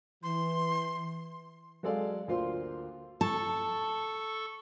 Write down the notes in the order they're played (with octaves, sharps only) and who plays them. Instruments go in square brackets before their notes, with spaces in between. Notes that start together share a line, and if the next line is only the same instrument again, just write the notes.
[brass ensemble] E3 [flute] C6
[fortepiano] F#3 G#3 A4 D5 F5
D2 A#3 F4 C5 C6
[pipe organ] A4 C#6 [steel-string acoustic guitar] A5